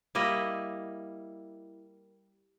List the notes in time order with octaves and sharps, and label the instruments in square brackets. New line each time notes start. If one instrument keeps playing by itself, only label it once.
[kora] G3 A#3 E4 D#5